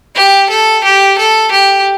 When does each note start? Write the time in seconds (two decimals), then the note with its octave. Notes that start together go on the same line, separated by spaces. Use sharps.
0.15 G4
0.50 A4
0.84 G4
1.19 A4
1.52 G4